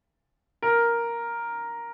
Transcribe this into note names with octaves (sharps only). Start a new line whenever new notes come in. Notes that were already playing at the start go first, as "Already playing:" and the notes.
A#4